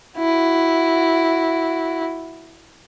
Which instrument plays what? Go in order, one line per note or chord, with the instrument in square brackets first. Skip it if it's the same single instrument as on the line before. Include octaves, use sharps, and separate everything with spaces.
[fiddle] E4 F#4